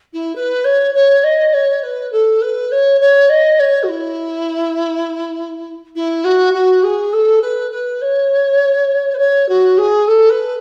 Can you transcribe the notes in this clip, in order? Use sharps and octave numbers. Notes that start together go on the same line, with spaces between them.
E4
B4
C#5
C#5
D#5
C#5
B4
A4
B4
C#5
C#5
D#5
C#5
F#4
E4
E4
F#4
F#4
G#4
A4
B4
B4
C#5
B4
C#5
F#4
G#4
A4
B4